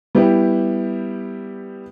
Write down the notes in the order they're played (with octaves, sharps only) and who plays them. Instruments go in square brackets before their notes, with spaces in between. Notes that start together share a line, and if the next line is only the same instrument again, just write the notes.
[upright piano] G3 B3 E4 G4